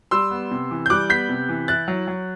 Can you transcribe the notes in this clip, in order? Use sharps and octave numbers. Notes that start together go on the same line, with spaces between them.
G3 C6 E6
B3
C3
E3
G6
G3 D6 F#6
B3 G6 B6
C3
E3
E4 F#6 A6
F#3
F#3